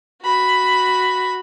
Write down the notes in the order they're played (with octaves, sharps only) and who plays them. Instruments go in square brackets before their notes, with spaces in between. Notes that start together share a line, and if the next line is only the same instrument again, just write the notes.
[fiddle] F#4 B5